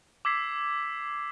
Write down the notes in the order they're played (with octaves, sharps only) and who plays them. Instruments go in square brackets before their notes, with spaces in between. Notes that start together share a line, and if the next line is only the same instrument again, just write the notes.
[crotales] D6 E6 G#6 B6 C7